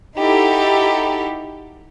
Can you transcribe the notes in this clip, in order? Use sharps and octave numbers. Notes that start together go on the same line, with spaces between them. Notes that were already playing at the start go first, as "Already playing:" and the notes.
D#4 E4 F#4 G4 A4